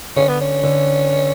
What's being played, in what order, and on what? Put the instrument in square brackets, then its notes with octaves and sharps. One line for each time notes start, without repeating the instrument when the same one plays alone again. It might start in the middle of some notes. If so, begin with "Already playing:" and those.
[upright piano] D3 [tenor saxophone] C#4
[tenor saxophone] B3
C#4
[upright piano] D3